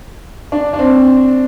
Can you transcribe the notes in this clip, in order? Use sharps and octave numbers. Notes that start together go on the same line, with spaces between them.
D4
D4
C4